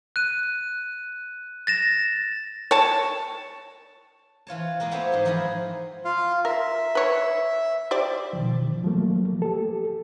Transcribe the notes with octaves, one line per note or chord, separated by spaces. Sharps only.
F#6 D#7
A6 A#6 E7
C#5 A5
E3 F4 C#5 A5
G#3 A#3 F4 D#5
A3 B3 C4 G4 C#5 E5
G#2 G#4
E3 F3 C4 G#4 A#5 B5
F4 F5
A#4 E5
B4 C#5
G4 C5 D5
B2 D#3 F3
F3 F#3 A3 A#3
G4 A4